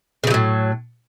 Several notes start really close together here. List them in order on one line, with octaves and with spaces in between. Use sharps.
C#3 F3 F#3 A2